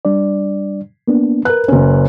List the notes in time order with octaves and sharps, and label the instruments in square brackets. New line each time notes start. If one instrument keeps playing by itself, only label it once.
[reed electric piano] G3 D4 D5
A#3 B3 D4
[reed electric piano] A#4 B4 [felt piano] F#6
[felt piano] F#1 C#4